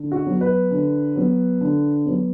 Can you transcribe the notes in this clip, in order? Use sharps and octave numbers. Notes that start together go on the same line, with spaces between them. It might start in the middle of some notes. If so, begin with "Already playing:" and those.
Already playing: D3
F#4
F#3 B3
B4
D3
F#3 B3
D3
F#3 B3